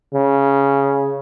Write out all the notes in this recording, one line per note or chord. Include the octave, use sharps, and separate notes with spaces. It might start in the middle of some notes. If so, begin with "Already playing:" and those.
C#3